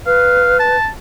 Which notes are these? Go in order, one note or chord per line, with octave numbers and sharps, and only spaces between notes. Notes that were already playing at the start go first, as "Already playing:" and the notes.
B4 F5
A5